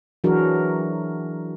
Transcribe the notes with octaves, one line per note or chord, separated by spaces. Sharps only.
E3 F#3 D4 F#4 G#4 A#4